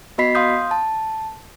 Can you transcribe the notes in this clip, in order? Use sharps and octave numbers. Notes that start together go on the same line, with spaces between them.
B3 F#4 D#5 B5 B6 C7
F5 C6 D#6 G6
A5